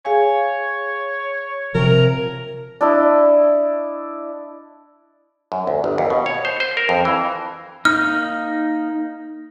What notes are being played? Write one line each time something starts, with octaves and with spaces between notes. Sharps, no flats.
G#4 C#5 F5 G#5
C3 F3 A#4
D4 E4 D#5
F#2
D2
G1
D#2
B2
C#5
C5
C5
A#4
F2
E3
A#3 D#4 F6